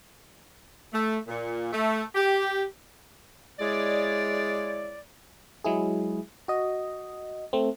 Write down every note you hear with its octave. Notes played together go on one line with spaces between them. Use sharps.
A3
A#2
A3
G4
G#3 E4 G#4 C#5 D5
F#3 G#3 E4 G#4
F#4 D#5
A3 C4